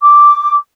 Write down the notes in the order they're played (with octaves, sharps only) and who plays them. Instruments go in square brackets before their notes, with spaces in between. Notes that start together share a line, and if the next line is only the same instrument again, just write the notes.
[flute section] D6